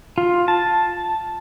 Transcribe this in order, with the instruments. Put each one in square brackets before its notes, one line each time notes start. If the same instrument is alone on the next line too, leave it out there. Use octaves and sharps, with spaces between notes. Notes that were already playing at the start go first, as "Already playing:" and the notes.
[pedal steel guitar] F4
A5